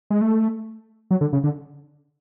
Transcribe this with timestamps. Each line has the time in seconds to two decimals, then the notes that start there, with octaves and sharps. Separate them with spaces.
0.10 G#3
0.21 A3
1.11 F#3
1.21 D3
1.33 C#3
1.44 D3